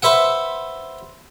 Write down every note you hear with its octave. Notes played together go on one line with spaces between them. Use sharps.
B4 C5 E5 F#5